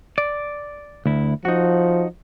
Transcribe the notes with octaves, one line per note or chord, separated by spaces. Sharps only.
D5
D2 E4
F3 D#4 F#4